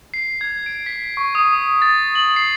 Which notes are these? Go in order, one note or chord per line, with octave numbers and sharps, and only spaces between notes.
C7
G#6
D7
B6
C#6
D#6
A6
F#7
C7